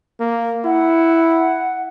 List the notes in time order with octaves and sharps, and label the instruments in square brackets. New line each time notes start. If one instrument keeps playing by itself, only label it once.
[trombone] A#3
[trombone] E4 [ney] F#5